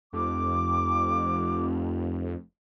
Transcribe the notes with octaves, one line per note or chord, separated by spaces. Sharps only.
F1 F2 D6